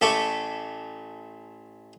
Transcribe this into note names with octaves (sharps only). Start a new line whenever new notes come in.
A1 A3 A4 B5 C#6 D6